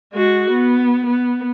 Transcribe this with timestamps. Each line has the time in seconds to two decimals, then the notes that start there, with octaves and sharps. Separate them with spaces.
0.13 G#3 F#4
0.50 B3
1.06 B3